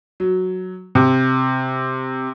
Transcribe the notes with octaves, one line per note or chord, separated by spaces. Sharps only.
F#3
C3